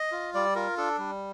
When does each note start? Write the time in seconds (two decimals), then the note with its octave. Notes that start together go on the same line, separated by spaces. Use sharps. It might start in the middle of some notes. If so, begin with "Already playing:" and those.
Already playing: D#5
0.12 F4
0.34 G3 D5
0.55 F4 A#4
0.77 D4 A4
0.98 G3